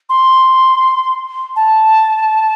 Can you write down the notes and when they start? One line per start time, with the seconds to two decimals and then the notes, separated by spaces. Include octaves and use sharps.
0.09 C6
1.56 A5